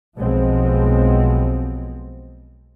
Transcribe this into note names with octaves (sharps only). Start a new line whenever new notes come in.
B1 F3 G#3 B3 C4